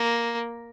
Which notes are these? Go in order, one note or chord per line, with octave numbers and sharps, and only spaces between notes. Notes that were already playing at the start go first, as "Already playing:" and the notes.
Already playing: A#3